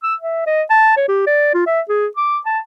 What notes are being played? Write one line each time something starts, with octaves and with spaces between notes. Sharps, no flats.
E6
E5
D#5
A5
C#5
G4
D5
F4
E5
G#4
D6
A5